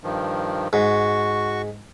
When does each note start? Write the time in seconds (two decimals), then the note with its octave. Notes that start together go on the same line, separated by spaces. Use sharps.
0.04 G2 D#3 F3
0.73 G#2 F#4 C#6